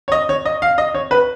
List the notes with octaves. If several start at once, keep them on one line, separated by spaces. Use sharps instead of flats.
C#5
D#5
C#5
D#5
F5
D#5
C#5
B4